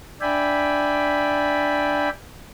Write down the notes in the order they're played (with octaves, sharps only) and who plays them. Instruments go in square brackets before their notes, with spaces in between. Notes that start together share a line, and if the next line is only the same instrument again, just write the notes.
[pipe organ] D4 D5 E5 G5 G#5 B5